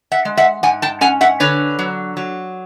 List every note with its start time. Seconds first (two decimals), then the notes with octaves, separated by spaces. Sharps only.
0.12 E5 F#5
0.25 G#3
0.37 E5 F#5
0.63 G#2 F#5 G#5
0.82 G5 A5
1.01 C#4 F#5 G#5
1.21 E5 F#5
1.40 D3 B4 C#5
1.79 F#3
2.17 F#3